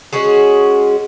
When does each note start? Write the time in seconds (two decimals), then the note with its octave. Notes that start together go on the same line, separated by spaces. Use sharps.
0.13 G#3 C#4 F#4 G#4